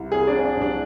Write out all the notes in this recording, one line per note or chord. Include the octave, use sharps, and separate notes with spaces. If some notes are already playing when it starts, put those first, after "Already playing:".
Already playing: C2
C3 G#4
D4
F3
D4
C2
D4